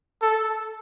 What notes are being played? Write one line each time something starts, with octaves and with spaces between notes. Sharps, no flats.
A4